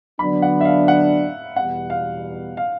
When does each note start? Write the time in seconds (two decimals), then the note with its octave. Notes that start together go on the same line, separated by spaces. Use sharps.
0.19 D3 F#3 B3 D4 B5
0.42 F#5
0.61 E5
0.65 F5
0.88 F#5
1.56 E2 B2 G3 B3 F#5
1.90 F5
2.57 F5